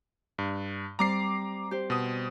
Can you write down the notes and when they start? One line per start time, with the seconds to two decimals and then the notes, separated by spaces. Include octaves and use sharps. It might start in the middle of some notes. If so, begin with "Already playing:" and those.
0.38 G2
0.99 G3 C4 A#5 D6 C7
1.71 G4 C5
1.90 B2 D#6